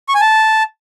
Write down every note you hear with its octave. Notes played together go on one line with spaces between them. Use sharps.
C#6
G#5
A5